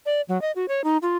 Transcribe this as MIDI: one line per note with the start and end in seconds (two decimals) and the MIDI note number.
0.06 0.21 74
0.28 0.40 54
0.42 0.51 75
0.56 0.66 66
0.68 0.84 73
0.84 0.97 63
1.02 1.17 65